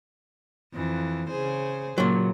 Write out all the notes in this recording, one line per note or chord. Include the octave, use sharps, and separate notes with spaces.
F2 E3
C#3 G#4 C5
A#2 C#3 F#3